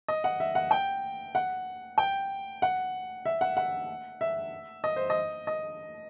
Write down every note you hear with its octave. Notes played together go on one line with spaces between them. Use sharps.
D#5
F#5
E5
F#5
G5
F#5
G5
F#5
E5
F#5
F#5
E5
D#5
C5
D#5
D#5